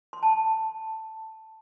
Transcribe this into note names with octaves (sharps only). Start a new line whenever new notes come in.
C6
A5